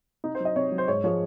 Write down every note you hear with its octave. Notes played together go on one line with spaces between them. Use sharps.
C3 D#4
C5
F#3
D#5
C3 C#5
F#3
C5
G#2 C#5
F3 G#3 C#5